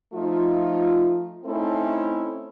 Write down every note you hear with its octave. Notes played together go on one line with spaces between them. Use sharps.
F3 A3 D#4 F4
A3 C4 C#4 D#4 E4 A4